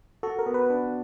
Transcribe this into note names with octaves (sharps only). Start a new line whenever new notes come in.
F#4 A4
A#4
B3
B4
D4